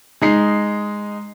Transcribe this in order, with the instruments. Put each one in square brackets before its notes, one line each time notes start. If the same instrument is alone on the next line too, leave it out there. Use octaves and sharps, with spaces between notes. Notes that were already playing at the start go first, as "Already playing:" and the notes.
[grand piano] G#3 D#4 C7